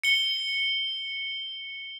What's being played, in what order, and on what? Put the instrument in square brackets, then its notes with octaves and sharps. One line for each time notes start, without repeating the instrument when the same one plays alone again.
[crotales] C#7 G7